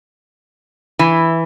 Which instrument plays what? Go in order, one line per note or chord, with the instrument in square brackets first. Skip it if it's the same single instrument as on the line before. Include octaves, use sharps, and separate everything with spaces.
[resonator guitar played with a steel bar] E3